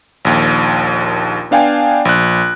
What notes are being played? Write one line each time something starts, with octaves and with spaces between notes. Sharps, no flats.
A#1 D#2
B3 D4 F5 G5 G#5
A#1 F#6